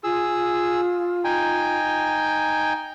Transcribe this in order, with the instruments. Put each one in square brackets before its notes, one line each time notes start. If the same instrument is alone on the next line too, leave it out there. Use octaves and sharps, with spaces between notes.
[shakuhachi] F4 [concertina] G#4 E6
[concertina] D#4 G5 G#5